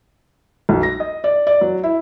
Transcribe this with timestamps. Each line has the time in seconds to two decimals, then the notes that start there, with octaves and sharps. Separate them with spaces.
0.69 B1
0.83 A#6
1.00 D#5
1.24 D5
1.47 D5
1.61 F#3
1.83 E4